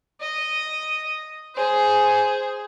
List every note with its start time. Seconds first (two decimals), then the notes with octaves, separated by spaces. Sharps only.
0.21 D#5
1.55 G#4 C5